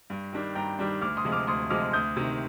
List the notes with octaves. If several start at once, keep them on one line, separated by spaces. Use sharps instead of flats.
G2
D#3 G3 D4
G2 G5 A#5
D#3 G3 D4
D2 D6 F6
C6 D#6
C3 F3 G#3
D6 F6
D2 C6 D#6
C3 F3 G#3 D6 F6
D2 D#6 G6
C3 D#3